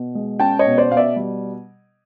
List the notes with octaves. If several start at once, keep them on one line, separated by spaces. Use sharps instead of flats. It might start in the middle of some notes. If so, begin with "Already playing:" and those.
Already playing: B2
G#3
C#4 G5 A5
C#5 D#5
B2
C5 D5
B2 F5
D5 E5
G3